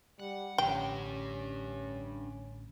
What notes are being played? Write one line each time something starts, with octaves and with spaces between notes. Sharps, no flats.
G3 F#5
A1 D3 F3 C#4 D4 G4 G5